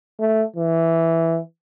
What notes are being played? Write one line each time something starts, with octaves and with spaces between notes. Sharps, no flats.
A3
E3